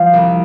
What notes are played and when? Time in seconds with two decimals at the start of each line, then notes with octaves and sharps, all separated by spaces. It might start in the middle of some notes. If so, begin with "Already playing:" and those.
Already playing: F3 F4
0.13 C2